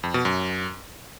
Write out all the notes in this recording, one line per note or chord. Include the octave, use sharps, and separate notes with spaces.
F2
B2
F#2